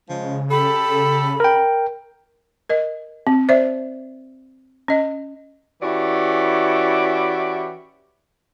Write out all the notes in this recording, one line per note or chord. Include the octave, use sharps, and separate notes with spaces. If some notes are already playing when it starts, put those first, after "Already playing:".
C#3 F3 G#3
G4 A4 B5
A#4 G5
A#4 D#5
C4
C5 D5 E5
C#4 D#5
E3 C#4 E4 F#4 G4 D5